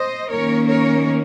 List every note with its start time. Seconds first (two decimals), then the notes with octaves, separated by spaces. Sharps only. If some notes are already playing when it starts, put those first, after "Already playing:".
Already playing: C5 D#5
0.31 D#3 A#3 C#4 A#4 C#5
0.69 A#4 C#5